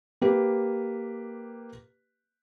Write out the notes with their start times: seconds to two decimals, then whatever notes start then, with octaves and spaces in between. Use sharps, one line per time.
0.21 A#3 G4 B4